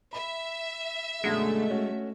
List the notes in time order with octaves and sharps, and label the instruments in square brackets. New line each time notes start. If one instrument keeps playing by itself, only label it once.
[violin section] E5 [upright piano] B5
[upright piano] F#2 B2 D3 [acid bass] G#3 [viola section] A3
[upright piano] C#4 F#4